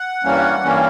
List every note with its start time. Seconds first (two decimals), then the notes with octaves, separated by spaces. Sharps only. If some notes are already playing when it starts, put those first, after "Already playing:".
Already playing: F#5
0.24 G2 E3 G3 A#3 C#4
0.63 G2 E3 G3 A#3 C#4